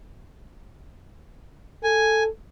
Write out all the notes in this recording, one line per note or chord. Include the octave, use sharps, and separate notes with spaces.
A4 G#5